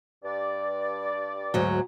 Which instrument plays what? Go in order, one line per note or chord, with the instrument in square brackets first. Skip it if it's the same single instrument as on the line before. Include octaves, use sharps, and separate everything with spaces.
[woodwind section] G2 D5
[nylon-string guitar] D2 G#2 F#3